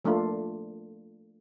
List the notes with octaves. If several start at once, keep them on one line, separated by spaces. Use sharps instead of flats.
F3 A3 A#3 D4 F4